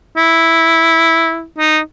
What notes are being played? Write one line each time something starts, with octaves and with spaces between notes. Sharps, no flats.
E4
D#4